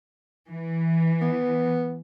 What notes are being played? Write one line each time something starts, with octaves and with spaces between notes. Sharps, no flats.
E3
B3